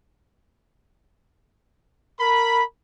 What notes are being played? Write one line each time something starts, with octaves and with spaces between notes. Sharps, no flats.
A#4 B5